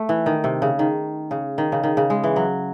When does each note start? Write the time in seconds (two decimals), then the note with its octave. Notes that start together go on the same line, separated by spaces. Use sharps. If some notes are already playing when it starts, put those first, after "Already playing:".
Already playing: A3
0.09 E3
0.26 D#3
0.44 C3
0.62 C#3
0.79 D#3
1.31 C#3
1.58 D#3
1.72 C#3
1.83 D#3
1.97 C#3
2.10 G#3
2.24 E3
2.36 F#3